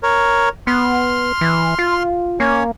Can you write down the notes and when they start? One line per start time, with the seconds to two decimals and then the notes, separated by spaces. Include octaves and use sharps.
0.03 A#4 C#5
0.67 B3 C6 F6
1.41 E3
1.79 F4
2.40 A#3 C#4 C#5